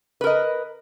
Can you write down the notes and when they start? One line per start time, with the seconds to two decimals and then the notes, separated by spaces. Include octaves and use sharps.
0.21 B4
0.24 A#4
0.27 D#5